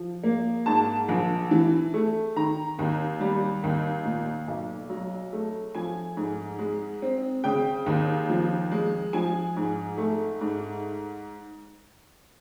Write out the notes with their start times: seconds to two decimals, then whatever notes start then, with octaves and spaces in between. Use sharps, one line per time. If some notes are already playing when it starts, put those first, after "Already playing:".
Already playing: F3
0.23 A#3
0.66 G#2 A5
1.09 A#1
1.51 E3
1.94 A3
2.36 D#3 A#5
2.79 D#2
3.20 G3
3.64 D#2
4.05 A#2
4.47 B1
4.90 F#3
5.33 A3
5.75 F3 G#5
6.17 G#2
6.59 G#3
7.02 C4
7.44 C#3 G5
7.86 D#2
8.29 F3
8.72 G#3
9.13 F3 G#5
9.57 G#2
9.98 A3
10.41 G#2